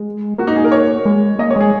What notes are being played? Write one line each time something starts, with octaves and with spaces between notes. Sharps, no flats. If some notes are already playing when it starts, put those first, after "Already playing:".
Already playing: G#3
A#3 F#4
D#4
G#4
A#4
C#5
G#3
A#3 D#5
C#5
G#3 G#4